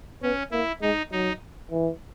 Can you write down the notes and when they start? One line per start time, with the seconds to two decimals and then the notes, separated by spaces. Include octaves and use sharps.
0.22 B3 C#4
0.52 A#3 E4
0.81 G#3 D#4
1.11 F#3 D#4
1.71 E3